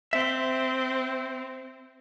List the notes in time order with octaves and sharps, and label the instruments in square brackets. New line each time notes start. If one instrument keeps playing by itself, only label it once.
[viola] C4 [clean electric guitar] E5